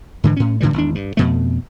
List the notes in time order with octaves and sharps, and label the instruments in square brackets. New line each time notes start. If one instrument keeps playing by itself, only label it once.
[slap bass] G#2 D3 E3
A2 C#4
A2 D3 E3 G3
G#1 E2 D4
G2
F2 B2 A3